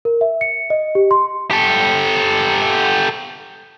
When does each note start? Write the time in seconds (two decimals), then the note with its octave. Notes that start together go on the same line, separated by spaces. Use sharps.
0.05 A#4
0.21 E5
0.41 C#7
0.70 D#5
0.95 G4
1.11 C6
1.51 G4 A4